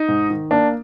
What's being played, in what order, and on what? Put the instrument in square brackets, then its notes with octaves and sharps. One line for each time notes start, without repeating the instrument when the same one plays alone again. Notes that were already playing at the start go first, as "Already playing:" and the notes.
Already playing: [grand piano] D#4
G#2
D#3
A#3 D4